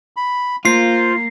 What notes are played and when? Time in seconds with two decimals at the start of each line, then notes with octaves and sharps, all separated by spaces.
0.17 B5
0.65 A#3 F4 C5 C7